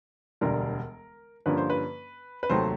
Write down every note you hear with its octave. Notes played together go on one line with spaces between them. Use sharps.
E1 D2 D3 G3 A#4
G2 D3 F3 A#3 C#4 B4
C5
B4
B4
F1 D#2 D#3 F#3 A3 C5